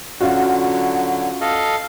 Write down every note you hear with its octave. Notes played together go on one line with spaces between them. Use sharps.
D3 F#3 C#4 F4 F#4
A4 D#5 F5